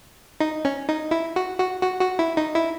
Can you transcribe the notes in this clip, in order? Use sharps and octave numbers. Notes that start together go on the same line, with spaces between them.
D#4
C#4
D#4
E4
F#4
F#4
F#4
F#4
E4
D#4
E4